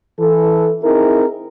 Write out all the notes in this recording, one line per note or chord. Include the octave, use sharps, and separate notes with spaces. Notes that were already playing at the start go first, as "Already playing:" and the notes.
E3 A4
C4 D#4 E4 G#4 A#4